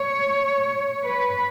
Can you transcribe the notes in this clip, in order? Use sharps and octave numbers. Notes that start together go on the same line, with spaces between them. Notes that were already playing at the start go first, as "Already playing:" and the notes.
Already playing: C#5
B4